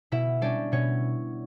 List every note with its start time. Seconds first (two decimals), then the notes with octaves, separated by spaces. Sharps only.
0.12 B2 E4 E5
0.41 G3 C#4 D4 D5
0.72 B2 C#4 C#5